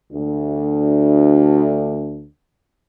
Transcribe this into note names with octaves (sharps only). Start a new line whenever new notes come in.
D2 D4